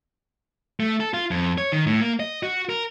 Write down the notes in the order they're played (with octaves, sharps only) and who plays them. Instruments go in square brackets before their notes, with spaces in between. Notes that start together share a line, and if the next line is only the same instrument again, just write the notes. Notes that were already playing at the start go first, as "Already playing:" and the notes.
[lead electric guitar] A3
A4
F4
F2
C#5
D#3
A2
A#3
D#5
F#4
A#4